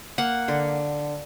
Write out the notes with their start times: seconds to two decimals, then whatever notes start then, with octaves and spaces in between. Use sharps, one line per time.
0.18 A#3 F#5
0.48 D3